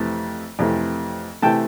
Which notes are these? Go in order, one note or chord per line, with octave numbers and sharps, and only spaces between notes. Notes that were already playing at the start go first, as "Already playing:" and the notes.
Already playing: F2 C3 E3 A3
F2 C3 E3 A3
C3 E3 A3 G5 A5